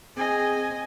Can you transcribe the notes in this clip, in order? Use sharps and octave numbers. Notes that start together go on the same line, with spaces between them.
C4 G#4 D#5 G#5